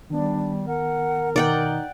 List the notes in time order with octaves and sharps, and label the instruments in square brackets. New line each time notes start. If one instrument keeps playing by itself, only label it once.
[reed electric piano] D#3 B3 [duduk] G3 [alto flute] D4
[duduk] A#4 [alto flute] F#5
[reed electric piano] B2 D#3 [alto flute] D#4 [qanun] D5 F#5 G5